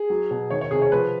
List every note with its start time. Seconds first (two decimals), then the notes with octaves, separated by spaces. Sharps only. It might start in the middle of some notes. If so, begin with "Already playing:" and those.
Already playing: G#4
0.10 F#3
0.31 B2
0.50 D#3 C#5
0.61 C#5
0.71 C3 G#4
0.82 C#5
0.92 F3 B4